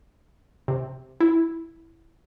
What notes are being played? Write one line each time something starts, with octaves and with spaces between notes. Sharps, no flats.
C3
E4